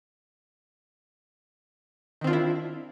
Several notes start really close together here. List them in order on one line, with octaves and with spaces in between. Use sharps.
D#3 C4 F4 D4 E4